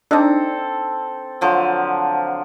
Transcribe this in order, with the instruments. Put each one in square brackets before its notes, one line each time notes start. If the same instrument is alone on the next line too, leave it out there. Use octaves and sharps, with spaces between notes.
[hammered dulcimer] C4 A4 [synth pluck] D4 D#4
[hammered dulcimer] D3 F3 F#3